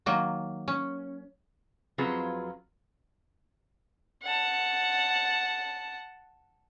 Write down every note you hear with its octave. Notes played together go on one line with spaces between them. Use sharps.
D#3 F#3 A#3
C#4
F2 F#3 C4 F4 G#4 B4
F#5 A5